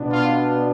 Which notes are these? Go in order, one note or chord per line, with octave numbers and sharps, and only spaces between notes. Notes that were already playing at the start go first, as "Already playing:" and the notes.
Already playing: B2 B3 D4
F4